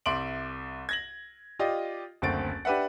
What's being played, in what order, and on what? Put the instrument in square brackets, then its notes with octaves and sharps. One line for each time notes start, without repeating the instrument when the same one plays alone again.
[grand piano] C2 E5 C6 D6 D7 F#7
G#6 A#6 F#7
F4 G4 D5 D#5
F#1 D2 C4 A6 D7
D4 G4 B4 E5 F#5